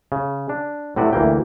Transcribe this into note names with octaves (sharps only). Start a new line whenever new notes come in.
C#3
D4
A2 C3 F#4 B4 D5
D2 E3 A#3 G5